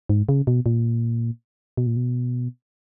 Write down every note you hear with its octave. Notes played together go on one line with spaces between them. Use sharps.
G#2
C#3
B2
A#2
B2
A#2
B2